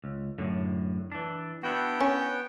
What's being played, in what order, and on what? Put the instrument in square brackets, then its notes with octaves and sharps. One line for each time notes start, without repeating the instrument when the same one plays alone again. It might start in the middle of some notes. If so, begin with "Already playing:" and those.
[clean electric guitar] C#2
F#2 A2 D3
E3 D4
[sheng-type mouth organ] B3 G5 [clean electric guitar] D4 E4 F#4
[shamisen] C#4